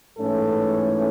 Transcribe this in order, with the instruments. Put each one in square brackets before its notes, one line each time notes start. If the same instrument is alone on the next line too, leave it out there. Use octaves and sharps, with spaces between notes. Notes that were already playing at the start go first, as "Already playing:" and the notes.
[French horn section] G#2 E3 A3 C#4 A4